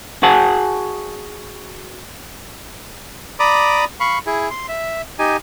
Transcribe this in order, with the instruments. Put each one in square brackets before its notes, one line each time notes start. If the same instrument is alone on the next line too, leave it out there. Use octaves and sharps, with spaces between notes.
[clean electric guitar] F#4 G#4 F#5 G#5 A5
[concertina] D5 A#5 B5 D6 D#6
F5 B5 C#6
E4 G#4
C6
E5
D#4 G4 G#5